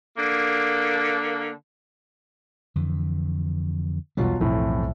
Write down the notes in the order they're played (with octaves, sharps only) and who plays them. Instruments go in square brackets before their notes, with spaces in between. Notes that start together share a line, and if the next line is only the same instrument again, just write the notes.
[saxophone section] D3 A#3
[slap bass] F2 D3 E3
[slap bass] B1 E2 G3 [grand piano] B2 F#3 F4
[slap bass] B1 [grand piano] F2 A2 E3